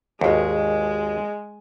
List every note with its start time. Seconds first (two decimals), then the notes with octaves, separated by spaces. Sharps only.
0.21 G#1 D#2 G#3